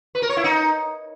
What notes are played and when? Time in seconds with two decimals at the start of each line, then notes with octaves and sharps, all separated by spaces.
0.15 B4
0.22 A#4
0.29 C#5
0.37 E4
0.44 D#4